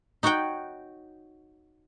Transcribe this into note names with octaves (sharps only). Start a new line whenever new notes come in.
D#4 F#4 C#5 F#5 G5